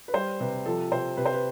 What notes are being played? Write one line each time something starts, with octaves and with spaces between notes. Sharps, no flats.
B4
G3 C5
C3 B4
F3 A4
C3 C5
C3 B4
C5
B4